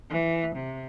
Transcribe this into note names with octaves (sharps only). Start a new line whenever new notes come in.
E3
C3